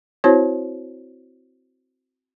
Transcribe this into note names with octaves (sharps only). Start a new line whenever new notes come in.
C4 E4 F#4 C5 C#5